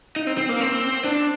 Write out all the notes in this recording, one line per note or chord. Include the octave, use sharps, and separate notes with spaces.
D#4
C4
C4
A#3
C4
D4